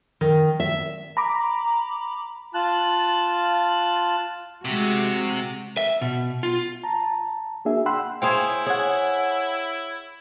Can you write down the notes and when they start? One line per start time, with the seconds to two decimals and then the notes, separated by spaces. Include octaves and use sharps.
0.21 D#3
0.60 E5
1.17 A#5 B5 D6
2.54 F4 A5 F#6
4.65 C3 G#3 F#4
5.77 E5
6.01 B2
6.43 F4
6.83 A5 A#5
7.65 A#3 D4 F#4 G#4 E5
7.86 F#5 G5 B5 C6 E6 F#6
8.22 E4 G#4 C5 C#5 F5 G5
8.66 G#4 C#5 F#5